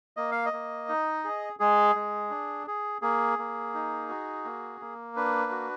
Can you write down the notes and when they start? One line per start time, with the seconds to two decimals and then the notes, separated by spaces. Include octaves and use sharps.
0.17 A#3 D#5
0.32 F5
0.46 D#5
0.53 A#3
0.89 D#4
1.24 G#4
1.60 G#3 G#4
1.95 G#3
2.30 D4
2.67 G#4
3.02 A#3 G#4
3.39 A#3
3.74 D#4
4.09 F#4
4.45 A#3
4.81 A#3
5.16 D4 B4
5.51 F#4